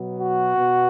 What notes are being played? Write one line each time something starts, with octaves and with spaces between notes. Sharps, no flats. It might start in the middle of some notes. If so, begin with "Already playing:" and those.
Already playing: B2 F#3 B3
F#4
B2 B3